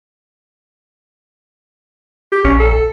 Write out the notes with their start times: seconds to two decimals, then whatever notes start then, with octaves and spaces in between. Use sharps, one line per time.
2.32 G4
2.44 A#1 C#4
2.60 A4